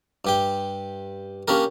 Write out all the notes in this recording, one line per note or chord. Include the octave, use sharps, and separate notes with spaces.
G2 G4 G5
A#3 C#4 D4 G4 A#4